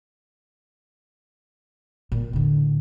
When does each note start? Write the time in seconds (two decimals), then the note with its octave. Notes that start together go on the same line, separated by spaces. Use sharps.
2.12 A#2
2.33 A2 D3